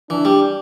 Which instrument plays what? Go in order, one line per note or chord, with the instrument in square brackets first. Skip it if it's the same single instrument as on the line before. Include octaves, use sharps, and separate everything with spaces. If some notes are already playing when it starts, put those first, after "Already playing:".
[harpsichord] E3 [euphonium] D4
[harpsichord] G3